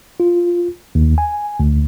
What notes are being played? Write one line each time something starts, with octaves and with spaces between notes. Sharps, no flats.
F4
D#2
G#5
D2